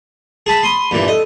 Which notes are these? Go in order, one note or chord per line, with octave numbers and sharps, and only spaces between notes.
G#4 A5 B5
B5 C6 D#6
G2 A#2 E3
A4 D#5